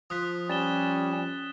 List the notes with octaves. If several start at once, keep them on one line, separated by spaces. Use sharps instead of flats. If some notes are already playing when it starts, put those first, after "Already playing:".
F3 D#6 F#6 B6
G3 C#4 A6 E7 G7